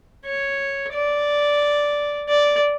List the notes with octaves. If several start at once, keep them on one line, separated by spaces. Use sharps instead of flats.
C#5
D5
D5